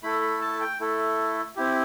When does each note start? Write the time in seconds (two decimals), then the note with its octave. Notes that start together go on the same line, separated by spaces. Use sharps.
0.03 A3 E4 A4 B5
0.21 B5
0.41 A5
0.61 G5
0.80 A3 E4 A4
1.56 C4 E4 G4